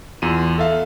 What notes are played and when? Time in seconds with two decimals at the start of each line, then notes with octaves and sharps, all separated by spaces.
0.22 E2 F4 D#7
0.58 A4 E5 F5